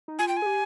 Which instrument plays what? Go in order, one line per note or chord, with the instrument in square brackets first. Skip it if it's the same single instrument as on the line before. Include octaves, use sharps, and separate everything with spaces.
[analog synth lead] D#4
[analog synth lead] F4 [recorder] G#5
[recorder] G5
G#5
[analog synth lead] G#4
G4